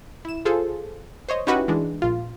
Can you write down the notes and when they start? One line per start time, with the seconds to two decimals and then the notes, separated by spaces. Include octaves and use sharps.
0.25 E4 E7
0.45 F4 G#4 A4 C5
1.29 C5 C#5 D#5
1.47 C#4 D#4 E4 F#4 G4 B4
1.68 E3 G#3 D4
2.02 A#1 F4